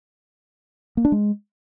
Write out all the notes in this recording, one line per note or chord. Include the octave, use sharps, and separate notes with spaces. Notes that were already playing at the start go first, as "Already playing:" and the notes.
A#3
D4
G#3